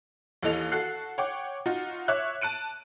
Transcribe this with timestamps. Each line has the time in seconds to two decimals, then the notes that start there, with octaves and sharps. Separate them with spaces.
0.43 D#2 E3 A4 D#5 F7
0.72 F#4 A4 F#6 C7
1.18 C#5 F#5 G5 D6
1.66 D#4 F4 F#4
2.08 C#5 E5 D6 F#6
2.42 A5 F#6 D7 D#7